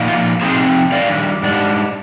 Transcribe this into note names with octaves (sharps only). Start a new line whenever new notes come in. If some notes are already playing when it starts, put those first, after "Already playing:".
Already playing: A#2 F3 A#3 D#4
F4
C3 F3 C4 D#4 G#4 C5
D#3 G3 D4 D5 F5
G#2 G3 D4